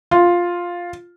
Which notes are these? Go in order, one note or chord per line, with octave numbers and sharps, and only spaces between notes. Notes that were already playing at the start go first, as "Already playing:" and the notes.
F4